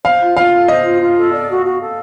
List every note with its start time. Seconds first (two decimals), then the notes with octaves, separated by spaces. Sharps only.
0.05 C5 F5
0.21 F4
0.36 F4 F5
0.53 A4
0.68 C5 D#5
0.84 F4
1.00 F4
1.16 A4
1.32 D5
1.48 F#4
1.63 F#4
1.79 A4